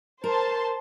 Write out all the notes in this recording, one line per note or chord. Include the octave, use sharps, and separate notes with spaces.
A#4 C5 A5 C6